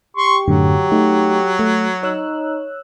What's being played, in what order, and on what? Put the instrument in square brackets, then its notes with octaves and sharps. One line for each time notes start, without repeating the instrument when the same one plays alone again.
[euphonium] G4 [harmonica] C6 C#6
[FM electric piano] F#2 A2 D3 [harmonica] F#3
[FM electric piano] A3 D#4
A3
[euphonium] D#4 [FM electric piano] C#5 E6 F#6